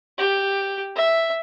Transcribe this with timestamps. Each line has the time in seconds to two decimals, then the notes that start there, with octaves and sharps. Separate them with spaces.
0.18 G4
0.96 E5